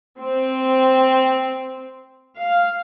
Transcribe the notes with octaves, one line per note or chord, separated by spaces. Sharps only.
C4
F5